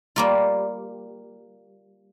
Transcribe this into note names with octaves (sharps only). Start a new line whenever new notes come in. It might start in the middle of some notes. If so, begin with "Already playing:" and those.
G3 A#3 F4